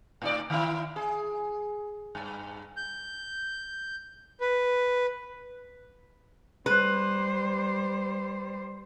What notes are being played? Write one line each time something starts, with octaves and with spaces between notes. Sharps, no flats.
A2 D#4 D5
D#3 E4
G#4
G2
G6
B4
G3 B4 C5